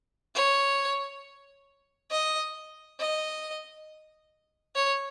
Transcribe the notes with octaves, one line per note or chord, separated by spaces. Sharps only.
C#5
D#5
D#5
C#5